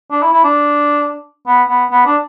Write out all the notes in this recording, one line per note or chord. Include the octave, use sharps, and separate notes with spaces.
D4
E4
E4
D4
B3
B3
B3
D4